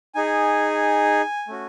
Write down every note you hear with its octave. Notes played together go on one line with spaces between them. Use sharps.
D#4 G#4 G#5
A3 C#4 F#4